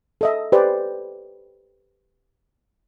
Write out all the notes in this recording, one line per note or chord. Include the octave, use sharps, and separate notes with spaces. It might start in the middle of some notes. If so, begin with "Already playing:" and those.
A4 D#5 E5
G4 B4 C5 D5